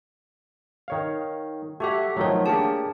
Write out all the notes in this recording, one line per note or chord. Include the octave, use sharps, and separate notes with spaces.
D#3 C#5 F5
A3 F#4 G4 E5 F#5
D#3 F3 F#3 A3 C#5
A#3 D4 G4 G#4 A5